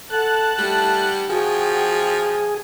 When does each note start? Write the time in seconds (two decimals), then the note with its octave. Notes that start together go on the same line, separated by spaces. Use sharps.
0.10 A4 F#5 A5 F#6
0.58 G3 A3
1.30 F3 F#4 G#4 G5